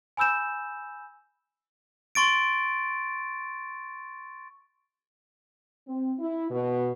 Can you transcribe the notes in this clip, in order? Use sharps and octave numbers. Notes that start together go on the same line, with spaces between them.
G#5 B5 E6 G6 E7
C6 C#6 A6 D7
C4
E4
B2